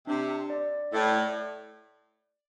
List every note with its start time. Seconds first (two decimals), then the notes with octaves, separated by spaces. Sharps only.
0.07 C3 D4
0.50 D5
0.93 A2 D5